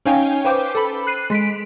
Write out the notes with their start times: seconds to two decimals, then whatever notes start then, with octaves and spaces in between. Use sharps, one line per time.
0.05 C#4 D#4 C#5 F5 G5 G#5
0.45 B4 C5 G5 D6 G6
0.75 A4 B5
1.07 F#6 C7 D#7
1.30 G#3 B6 D7